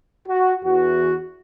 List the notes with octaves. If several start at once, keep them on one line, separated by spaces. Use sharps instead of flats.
F#4
E2 E3 F#4